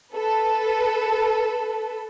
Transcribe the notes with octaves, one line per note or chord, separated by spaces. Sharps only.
A4 B4